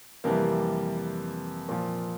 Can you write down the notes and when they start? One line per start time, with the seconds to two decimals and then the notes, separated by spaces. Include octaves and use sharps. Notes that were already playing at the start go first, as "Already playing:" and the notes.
0.24 F2 C3 E3 G3 A#3
1.69 A#2 F3